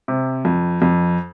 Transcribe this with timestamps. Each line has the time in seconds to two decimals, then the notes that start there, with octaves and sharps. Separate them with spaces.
0.08 C3
0.45 F2
0.82 F2